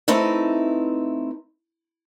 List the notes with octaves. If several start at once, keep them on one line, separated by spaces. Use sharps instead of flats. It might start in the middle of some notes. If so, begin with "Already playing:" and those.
A3 C4 D#4 E4 B4